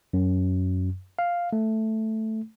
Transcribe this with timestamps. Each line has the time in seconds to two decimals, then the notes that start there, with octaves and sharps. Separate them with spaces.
0.13 F#2
1.19 F5
1.53 A3